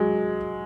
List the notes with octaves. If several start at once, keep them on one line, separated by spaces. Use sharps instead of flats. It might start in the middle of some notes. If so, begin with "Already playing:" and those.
Already playing: F#3 G#3